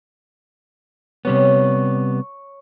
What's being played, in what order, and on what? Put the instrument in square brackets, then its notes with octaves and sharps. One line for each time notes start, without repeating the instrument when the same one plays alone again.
[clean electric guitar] C3 G3 B3 [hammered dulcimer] C#5